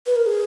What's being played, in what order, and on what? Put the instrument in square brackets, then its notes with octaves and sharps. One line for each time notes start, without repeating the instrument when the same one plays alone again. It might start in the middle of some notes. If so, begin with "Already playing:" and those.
[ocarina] B4
A#4
G#4